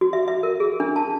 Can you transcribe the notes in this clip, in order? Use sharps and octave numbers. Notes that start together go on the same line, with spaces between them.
F#4
E5
E5
A#4
G#4
D4
A5